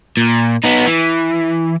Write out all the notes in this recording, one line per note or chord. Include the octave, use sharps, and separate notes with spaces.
A#2
B3 D#4
E3